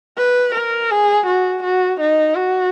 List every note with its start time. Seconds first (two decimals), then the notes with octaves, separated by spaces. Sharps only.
0.18 B4
0.55 A#4
0.91 G#4
1.26 F#4
1.63 F#4
2.00 D#4
2.35 F#4